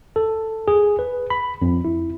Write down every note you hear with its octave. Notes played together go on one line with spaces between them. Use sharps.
A4
G#4
B4
B5
F2
E4